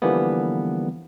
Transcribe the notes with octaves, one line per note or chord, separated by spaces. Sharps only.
D3 E3 F3 G3 A#3 B3